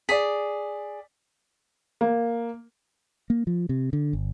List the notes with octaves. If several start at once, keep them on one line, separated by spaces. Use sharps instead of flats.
G#4 D5 B6
A#3
A#3
F3
C3
D3
G1